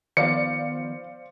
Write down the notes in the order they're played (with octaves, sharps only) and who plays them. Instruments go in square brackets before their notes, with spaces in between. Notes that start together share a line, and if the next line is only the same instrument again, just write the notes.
[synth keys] D#3 F3 B3 [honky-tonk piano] C5 D5 F5 [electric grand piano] C#7